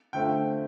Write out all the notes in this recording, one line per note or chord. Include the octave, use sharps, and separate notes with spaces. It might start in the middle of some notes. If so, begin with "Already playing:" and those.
D3 A3 C4 F4 G5